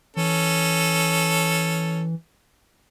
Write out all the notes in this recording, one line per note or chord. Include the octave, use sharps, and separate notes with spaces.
E3 C#4 A4